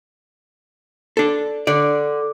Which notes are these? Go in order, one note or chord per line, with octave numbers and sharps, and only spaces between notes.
D4 A4
D3 D5